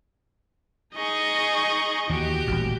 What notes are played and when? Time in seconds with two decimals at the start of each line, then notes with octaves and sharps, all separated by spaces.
0.95 D#4 G#4 D#5 G#5 C#6
2.09 D#2 E3 F#4 G4
2.47 D#1 A1